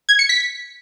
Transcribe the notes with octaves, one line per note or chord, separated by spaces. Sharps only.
G#6
C#7
B6